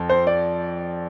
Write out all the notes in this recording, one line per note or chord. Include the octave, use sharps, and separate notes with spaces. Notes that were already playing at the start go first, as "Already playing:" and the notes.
Already playing: F2
C5
D5